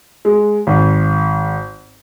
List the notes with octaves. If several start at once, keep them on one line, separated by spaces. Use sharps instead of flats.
G#3
G#1